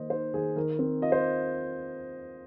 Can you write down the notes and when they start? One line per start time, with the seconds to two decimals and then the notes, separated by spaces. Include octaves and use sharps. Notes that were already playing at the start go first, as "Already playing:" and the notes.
Already playing: D#3 A#3 C5 D#5
0.10 D#4 C5
0.34 D#3 G#4
0.56 D#3 A#4
0.79 C4
1.02 F4 D#5
1.12 C5